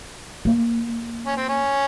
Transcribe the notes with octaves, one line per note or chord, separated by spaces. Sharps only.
A#3
C#4
C4
C#4